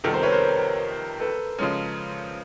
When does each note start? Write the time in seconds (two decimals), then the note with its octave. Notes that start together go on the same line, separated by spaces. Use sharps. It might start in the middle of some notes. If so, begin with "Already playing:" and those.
0.04 F2 C3 D#3 G3 B3 A4 B4
0.14 A#4 C5
0.23 B4 C#5
0.32 A#4 C5
1.20 A4 B4
1.59 C#3 F3 G#3 C#4